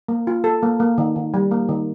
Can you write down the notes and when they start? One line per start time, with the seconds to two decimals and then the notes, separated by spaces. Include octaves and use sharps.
0.08 A#3
0.27 F4
0.44 A4
0.63 A#3
0.80 A#3
0.98 D#3
1.16 D#3
1.34 G3
1.51 A#3
1.69 D#3